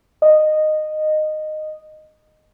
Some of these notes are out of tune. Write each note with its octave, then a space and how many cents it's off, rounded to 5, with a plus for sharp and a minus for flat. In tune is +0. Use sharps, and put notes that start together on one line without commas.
D#5 -15